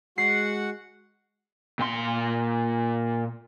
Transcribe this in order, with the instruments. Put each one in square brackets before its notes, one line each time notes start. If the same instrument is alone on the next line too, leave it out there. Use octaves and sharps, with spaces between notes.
[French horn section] G#3 [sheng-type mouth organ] F#4 F#5 [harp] C7
[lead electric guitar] A#2 C6